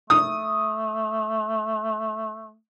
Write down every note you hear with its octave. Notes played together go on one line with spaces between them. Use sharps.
A3 D#6